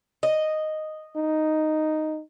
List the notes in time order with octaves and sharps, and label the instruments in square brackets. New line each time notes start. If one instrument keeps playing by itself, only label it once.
[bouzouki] D#5
[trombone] D#4